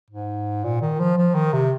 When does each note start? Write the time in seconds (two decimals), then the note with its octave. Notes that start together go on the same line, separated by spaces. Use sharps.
0.10 G#2
0.64 A#2
0.82 D#3
1.00 F3
1.18 F3
1.35 D#3
1.53 C3